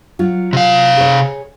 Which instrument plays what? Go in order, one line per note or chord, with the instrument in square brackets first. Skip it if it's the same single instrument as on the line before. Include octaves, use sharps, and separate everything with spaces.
[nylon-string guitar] F#3 F4
[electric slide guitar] C3 F5
[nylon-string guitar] G#4 C#5